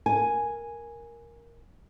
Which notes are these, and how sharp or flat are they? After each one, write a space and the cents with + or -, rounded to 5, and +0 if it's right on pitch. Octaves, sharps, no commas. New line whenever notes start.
A#4 +5 G#5 +0